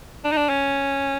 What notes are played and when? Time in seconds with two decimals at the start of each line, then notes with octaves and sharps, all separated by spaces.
0.25 D4
0.32 D#4
0.37 D4
0.49 C#4